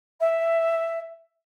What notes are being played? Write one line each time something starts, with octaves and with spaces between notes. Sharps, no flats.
E5